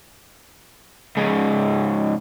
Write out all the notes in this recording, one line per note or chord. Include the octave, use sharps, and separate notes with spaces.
G#2 C#3